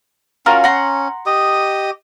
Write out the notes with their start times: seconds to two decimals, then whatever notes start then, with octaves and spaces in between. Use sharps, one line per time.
0.46 C#4 F4 F#4 A#4
0.64 F#5 A#5 C6
1.26 G4 D#5 D#6